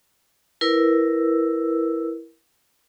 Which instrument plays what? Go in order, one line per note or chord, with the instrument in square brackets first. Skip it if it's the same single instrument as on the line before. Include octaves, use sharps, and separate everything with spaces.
[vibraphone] E4 A#4 B4 E6